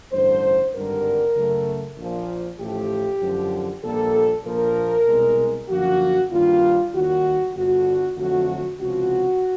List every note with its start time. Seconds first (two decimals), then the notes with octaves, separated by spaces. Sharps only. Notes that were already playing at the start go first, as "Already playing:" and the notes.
0.11 A1 G2 D3 C5
0.74 G#1 G2 D3 G3 A#4
1.35 F#2 C#3 F#3 A3
1.97 A#1 A#2 F3
2.59 A1 A2 F3 A3 G4
3.21 F#2 D3 F3
3.83 A#1 A#2 G3 A#3 A4
4.45 A#1 A#2 F3 A#4
5.08 C2 B2 G#3
5.69 F#2 D3 F3 A#3 F#4
6.31 G2 D#3 G3 A#3 F4
6.93 D#2 D#3 G3 F#4
7.55 G1 G2 D3 F#4
8.17 F2 D3 F#3 A3 F#4
8.79 C#2 C3 F3 F#4